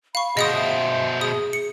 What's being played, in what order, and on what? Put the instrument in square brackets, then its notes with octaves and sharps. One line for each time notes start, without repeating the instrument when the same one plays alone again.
[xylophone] F5 C#6 [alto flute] B5
[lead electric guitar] B2 C5 [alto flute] G#4 [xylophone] D#5 F5 D#6
[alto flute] E5
[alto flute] G#4 [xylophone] D#6
[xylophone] C#7